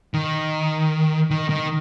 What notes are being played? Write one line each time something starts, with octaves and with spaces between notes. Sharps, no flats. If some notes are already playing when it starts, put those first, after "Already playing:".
D#3
D#3
D#3